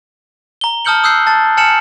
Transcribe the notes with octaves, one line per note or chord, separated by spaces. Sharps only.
A#5 G7
A5 D#6 F6 G6 C#7 F#7
D#6 E6 F#6 G6 C7
A5 A6
G#5 A5 F6 C#7 E7 F#7